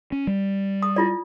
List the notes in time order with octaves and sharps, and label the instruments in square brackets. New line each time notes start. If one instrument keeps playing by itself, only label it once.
[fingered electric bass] C#4
G3
[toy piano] D#6
E4 F4 D5